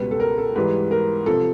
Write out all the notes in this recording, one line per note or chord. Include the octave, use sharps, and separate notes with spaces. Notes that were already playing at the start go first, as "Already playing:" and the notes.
Already playing: C#2 B2 G3 B4
A4
A#4
A4
G#2 E3 G3 B4
A#4
C3 F3 A4